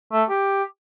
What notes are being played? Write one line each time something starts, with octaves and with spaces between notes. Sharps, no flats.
A3
G4